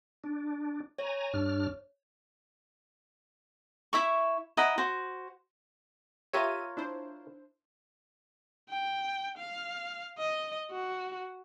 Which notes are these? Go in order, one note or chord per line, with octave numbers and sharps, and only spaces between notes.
D4
C#5 G#5 A#5
G2 D4 F6
E4 E5 C#6
E4 D#5 F#5 A#5
F#4 C5
F4 G4 A#4 C#5 E5 D#7
D4 E4 C5
G5
F5
D#5
F#4